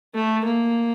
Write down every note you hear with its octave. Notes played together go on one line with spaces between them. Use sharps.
A3
A#3